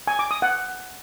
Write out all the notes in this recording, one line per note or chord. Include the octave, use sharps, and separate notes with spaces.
G#5
D6
D#6
F#5